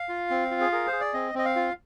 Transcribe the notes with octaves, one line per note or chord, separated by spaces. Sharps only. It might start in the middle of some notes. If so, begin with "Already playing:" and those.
Already playing: F5
F4
C4
F4
G#4
G#4 A#4
C5
G#4
D5
C4 D#5
C4 D#5
F5
F4